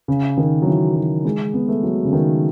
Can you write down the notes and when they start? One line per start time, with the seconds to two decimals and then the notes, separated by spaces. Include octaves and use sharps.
0.08 C#3
0.38 D#3
0.62 F#3
0.66 E3
0.95 F#3
1.25 G#3
1.54 B3
1.68 A3
1.83 F#3
2.05 C#3
2.13 D#3